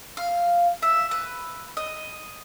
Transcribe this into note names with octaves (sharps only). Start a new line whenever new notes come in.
F5
E5
B4
D#5